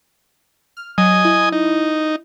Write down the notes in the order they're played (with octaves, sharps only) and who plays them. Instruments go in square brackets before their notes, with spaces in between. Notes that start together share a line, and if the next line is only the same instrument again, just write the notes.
[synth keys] F6
[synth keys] F#3 [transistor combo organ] D#5 G#5 D#6
[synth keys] E4
[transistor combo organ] D#4